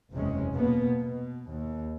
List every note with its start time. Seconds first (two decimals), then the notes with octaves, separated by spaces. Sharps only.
0.12 F#1 E2 C3 G#3 C#4
0.54 B2 A#3 B3
1.00 B2
1.48 D#2